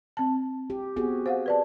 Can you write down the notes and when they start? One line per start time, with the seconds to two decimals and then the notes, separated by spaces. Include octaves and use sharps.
0.17 C4 A5
0.70 G4
0.96 B3 C4 F#4 G#4
1.26 C5 F5 F#5
1.46 B4 D5 A5